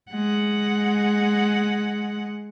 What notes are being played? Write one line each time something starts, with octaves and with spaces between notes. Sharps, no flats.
G#3 F#5